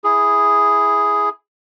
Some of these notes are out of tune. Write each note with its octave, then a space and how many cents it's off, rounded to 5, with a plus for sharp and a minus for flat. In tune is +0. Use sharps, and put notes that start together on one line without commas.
E4 +0 G#4 +0